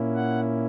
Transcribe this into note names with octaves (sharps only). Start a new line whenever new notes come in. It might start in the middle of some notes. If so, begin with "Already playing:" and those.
Already playing: A#2 A#3 C#4 E4
F#5